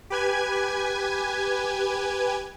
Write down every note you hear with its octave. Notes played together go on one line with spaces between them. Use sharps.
G4 B4 G#5 G#6